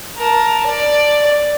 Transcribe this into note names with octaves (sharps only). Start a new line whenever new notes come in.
A#4 A5
D5